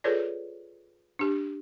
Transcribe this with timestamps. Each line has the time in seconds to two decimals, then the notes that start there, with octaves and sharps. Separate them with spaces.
0.04 F4 G#4 A4 B4 C#5 D5
1.19 D4 G4